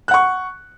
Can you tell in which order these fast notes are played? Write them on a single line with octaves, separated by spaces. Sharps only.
F#6 F#5 C#6